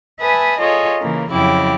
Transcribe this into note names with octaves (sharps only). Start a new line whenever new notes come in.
B4 E5 G#5 A5 D#6
F4 G#4 A4 C#5 D#5
C#3 E3 A#3
F2 C#3 F#3 E4 G4 D6